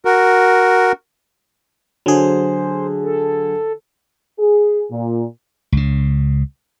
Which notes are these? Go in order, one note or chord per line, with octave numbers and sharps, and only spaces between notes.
F#4 A#4
D3 F#3 G#4 C5
A4
G#4
A#2
C#2 C#3